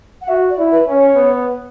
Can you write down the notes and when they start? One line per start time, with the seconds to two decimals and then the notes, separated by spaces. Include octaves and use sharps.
0.22 F#5
0.28 F#4 E5
0.50 D5
0.58 E4
0.72 B4
0.87 C#4
0.94 C#5
1.15 B3